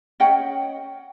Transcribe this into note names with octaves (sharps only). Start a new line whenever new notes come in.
C#4 D#5 F#5 G5